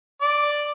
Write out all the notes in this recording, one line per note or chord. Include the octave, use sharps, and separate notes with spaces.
D5